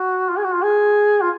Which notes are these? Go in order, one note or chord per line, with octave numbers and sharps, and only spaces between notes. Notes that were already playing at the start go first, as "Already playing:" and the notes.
Already playing: F#4
F4
G#4
F#4
F4
G#4
F4